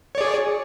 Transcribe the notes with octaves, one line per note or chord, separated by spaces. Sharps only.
G#4 C#5 D5